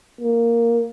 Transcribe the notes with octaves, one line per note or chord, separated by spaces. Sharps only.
A#3